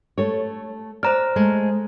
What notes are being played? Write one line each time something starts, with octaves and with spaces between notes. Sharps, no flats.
A3 A4 C#5
C5 D5 A#5 F6
G#3 A3